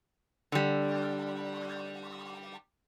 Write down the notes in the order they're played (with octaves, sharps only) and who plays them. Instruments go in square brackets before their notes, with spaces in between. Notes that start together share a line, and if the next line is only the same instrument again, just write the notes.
[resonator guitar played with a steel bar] D3 G3